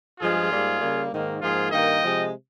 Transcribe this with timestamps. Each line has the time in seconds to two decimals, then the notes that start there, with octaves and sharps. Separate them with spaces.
0.20 G2 F3 G#3 F4 G#4
0.51 G#2 G3 A#3
0.81 C#3 G3 A#3
1.10 G#2 D#3 A#3
1.41 G#2 F3 A#3 F4 G#4
1.71 G2 D#3 A#3 D#5 G5
2.01 C3 F3 G#3